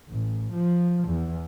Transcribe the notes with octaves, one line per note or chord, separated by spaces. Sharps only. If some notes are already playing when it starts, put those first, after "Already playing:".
A1
F3
E2